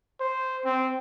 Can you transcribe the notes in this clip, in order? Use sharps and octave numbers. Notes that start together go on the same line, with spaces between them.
C5
C4